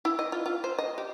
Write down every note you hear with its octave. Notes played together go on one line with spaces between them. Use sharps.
E4
D#5
F4
F4
C5
D#5
G4